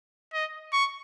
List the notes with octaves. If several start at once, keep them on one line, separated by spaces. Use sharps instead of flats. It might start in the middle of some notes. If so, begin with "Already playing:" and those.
D#5
C#6